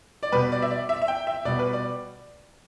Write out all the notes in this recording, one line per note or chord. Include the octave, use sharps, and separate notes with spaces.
D5
B2 G3 B4
D5
E5
D5
E5
E5
G5
E5
B2 G3 D5
B4
D5